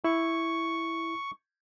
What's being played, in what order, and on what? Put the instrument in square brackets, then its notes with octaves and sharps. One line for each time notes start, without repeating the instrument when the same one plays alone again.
[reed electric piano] E4 [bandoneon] C#6